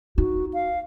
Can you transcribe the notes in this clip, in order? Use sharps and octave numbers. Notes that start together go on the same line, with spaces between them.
D#4 F#4
F5